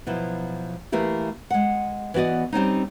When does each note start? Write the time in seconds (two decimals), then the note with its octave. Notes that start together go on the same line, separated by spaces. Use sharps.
0.06 B2 F3 F#3 E4
0.92 E3 A3 A#3 E4 G4
1.50 G#3 F#5
2.14 E3 B3 F#4 D5 D#5
2.52 G3 C4 C#4 D#4